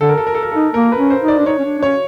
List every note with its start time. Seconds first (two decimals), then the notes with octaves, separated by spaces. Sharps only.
0.01 D3 A4
0.09 A#4
0.18 A4
0.27 A#4
0.35 A4
0.43 A#4
0.51 D#4 A4
0.74 A#3 A#4
0.92 B4
0.97 C#4
1.10 C5
1.22 D#4
1.28 D5
1.39 D4
1.46 D#4 C#5
1.58 C#4
1.64 D4
1.79 D4
1.83 C#4 C#5